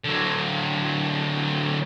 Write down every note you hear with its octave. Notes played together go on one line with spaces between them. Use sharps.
D3 F#3